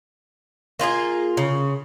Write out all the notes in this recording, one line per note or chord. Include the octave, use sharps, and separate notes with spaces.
A#3 F4 G4 G#4
C#3